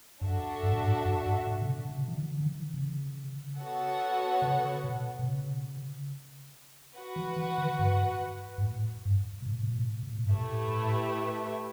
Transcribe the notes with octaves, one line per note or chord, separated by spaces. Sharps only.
F#2 D4 F#4 A4 E5
G2
A2
G2
F#2
G2
A2
C#3
B2
C#3
E3
D3
D3
E3
C#3
B3 F#4 A4 C#5 F#5
C#3
B2
B2
C#3
F#4 B4 F#5
E3
E3
D3
G2
G2
A2
G2
B2
A2
B2
A2
B2
A2
G2
A2 A3 E4 G4 B4 E5